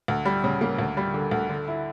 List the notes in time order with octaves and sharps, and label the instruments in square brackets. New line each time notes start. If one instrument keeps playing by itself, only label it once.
[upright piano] D2
G3
C#3
A#3
D2
G3
D3
D2
D3
E4